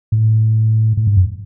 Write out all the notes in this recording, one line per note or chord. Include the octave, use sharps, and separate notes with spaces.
A2
A2
G#2
F#2